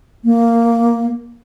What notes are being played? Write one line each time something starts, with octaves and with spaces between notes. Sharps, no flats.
A#3